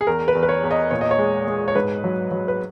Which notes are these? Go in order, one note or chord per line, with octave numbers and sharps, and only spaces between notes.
G#4
E2 A#4
B4
E2
B4
C#5
E2
D#5
A#2 C#5
D#5
C#5
G#3
G#3
C#5
G#2 B4
F#3
F#3
B4